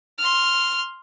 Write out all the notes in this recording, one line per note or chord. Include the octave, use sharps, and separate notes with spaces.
C6 F6